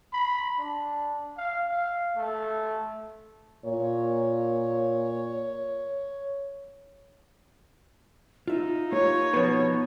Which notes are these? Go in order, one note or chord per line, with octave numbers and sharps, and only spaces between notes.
B5
D4
F5
F5
A3
A#2 C#5
D#4 F4 E5
A#3 F4 G4 C#5
B2 F3 F#4 B4